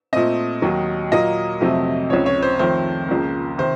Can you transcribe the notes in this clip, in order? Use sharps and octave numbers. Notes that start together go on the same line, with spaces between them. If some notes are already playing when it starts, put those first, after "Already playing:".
A#2 A3 C4 D#5
D#2 D#3 F#3
A#2 F#3 A#3 D#5
F2 C3 F#3 A3 C4
C#2 C#3 F3 C4 C#5
C#5
C5
F2 D#3 A3 C4 C5
C#2 C#3 F3 A#3
C3 D#3 C5